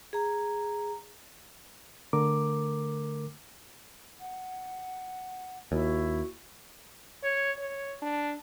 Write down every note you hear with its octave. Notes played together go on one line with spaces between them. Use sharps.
G#4 A#5
D3 A3 A#4 D6
F#5
D#2 E4 F#4
C#5
C#5
D4